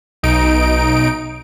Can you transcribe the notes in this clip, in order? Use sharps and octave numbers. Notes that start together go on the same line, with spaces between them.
B1 D#4 D7